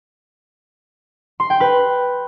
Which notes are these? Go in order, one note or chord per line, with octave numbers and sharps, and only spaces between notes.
C6
G5
B4